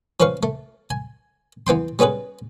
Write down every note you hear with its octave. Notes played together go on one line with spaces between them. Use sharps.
F3 C#4 B4 F5 C#6
A3
G#5
E3 B3 G5 C6
G3 B3 C#4 G#4 B4